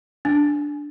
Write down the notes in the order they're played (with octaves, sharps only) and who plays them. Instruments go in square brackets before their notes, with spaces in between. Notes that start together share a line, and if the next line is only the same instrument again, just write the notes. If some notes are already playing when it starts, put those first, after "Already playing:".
[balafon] D4